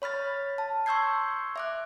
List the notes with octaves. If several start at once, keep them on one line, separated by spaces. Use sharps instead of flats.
C#5 B5 F6 A6
A5
C6 C#6 E6 G6 G#6 C7
E5 D6 F#6